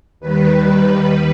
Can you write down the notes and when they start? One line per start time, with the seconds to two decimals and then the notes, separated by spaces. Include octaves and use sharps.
0.20 D#2 D#3 G3 B4